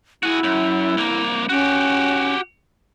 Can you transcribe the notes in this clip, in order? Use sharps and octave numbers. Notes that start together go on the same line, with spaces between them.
E4 F#4 G#4
F#2
C2 A#3
C#4 F#4 G4